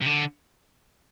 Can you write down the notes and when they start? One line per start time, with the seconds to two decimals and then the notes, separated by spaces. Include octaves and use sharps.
0.01 C3
0.06 D3